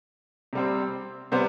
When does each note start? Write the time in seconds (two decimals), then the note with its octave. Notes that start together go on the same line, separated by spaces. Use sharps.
0.53 C3 G3 C4
1.32 C3 G3 B3 C5